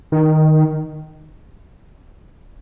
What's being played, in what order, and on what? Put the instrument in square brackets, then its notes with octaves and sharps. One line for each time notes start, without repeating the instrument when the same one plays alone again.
[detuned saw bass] D#3